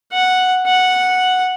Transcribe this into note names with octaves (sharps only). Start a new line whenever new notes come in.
F#5
F#5